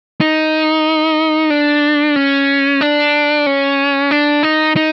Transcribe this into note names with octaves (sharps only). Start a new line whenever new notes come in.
D#4
D4
C#4
D4
C#4
D4
D#4
D#4